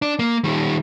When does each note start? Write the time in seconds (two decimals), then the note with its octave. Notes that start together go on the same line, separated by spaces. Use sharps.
0.02 D4
0.19 A#3
0.44 D#3 G3